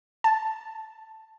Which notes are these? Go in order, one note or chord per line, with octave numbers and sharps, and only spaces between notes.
A5